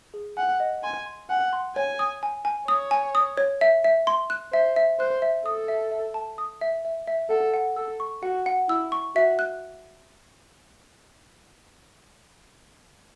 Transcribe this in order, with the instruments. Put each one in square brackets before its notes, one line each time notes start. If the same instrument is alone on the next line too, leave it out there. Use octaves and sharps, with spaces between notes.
[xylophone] G#4
[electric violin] F#5 [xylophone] G#5
[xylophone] D#5
[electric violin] G#5 [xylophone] C6
[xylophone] C6
[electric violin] F#5 [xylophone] G#5
[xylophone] C6
[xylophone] C#5 [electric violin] G#5
[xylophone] D#6
G#5
G#5
[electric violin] C#5 [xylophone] D#6
[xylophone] G#5
D#6
C#5
E5
E5
C6
F#6
[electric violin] C5 [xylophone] E5
[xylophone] E5
[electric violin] C5 [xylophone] F#6
[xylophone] E5
[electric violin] A4 [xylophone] D#6
[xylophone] E5
E5
A5
D#6
E5
E5
E5
[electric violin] A4 [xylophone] F#5
[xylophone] F#5
[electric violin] A4 [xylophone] E6
[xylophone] C#6
[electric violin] F#4 [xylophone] F#5
[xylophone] F#5
[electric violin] E4 [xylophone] E6
[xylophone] C#6
[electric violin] F#4 [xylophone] E5
[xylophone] F#6